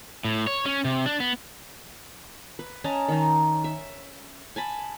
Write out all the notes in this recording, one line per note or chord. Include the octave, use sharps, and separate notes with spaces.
A2
C#5
C#4
C3
D4
B3
B4
C#4 D#5 A5 A#5
D#3 D#4
E5
G#5 A5 B5